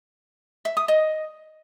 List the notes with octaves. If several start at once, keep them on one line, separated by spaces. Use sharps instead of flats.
E5
D#6
D#5